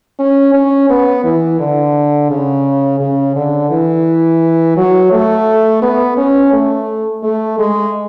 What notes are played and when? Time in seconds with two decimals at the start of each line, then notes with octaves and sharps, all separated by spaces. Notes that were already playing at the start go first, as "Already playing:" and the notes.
0.19 C#4
0.54 C#4
0.90 B3
1.24 E3
1.60 D3
2.31 C#3
3.00 C#3
3.36 D3
3.71 E3
4.77 F#3
5.12 A3
5.82 B3
6.17 C#4
6.53 A3
7.24 A3
7.59 G#3